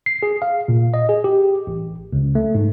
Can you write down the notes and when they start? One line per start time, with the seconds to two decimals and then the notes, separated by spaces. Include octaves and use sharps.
0.06 C7
0.23 G#4
0.42 F5
0.68 A#2
0.94 D#5
1.09 G#4
1.24 G4
1.67 A1
2.13 C#2
2.35 A3
2.55 G#2